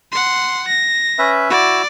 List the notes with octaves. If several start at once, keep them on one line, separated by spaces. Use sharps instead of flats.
F#5 C6
A#6
C#4 B4 E5
E4 F#4 D5 E6